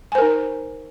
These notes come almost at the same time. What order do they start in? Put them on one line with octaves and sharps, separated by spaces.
G#5 C5 A#4 D#4